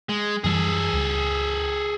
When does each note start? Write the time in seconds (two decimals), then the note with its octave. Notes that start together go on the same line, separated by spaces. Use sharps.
0.09 G#3
0.44 F#2 E3 G3 G#4 A4
0.93 C#2